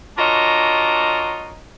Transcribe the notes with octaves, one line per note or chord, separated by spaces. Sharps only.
D4 F4 F#4 A#4 C#5 D#5